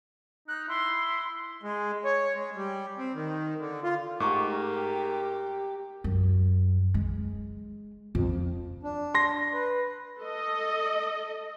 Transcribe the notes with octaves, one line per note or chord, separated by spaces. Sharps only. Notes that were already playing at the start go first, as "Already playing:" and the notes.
D#4 F#6
E4 C6
G#3
C#5
G#3
G3
C4
D#3
D3
F4
G#2 A3 G4 A#4 A#5 C#6 D6
F#2
G#3
F2
D4
C6 A#6
B4
A4 D#5